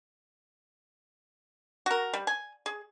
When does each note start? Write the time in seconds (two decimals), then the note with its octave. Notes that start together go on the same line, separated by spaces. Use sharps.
1.86 F#4 A#4
2.14 G3
2.27 G#5
2.66 G#4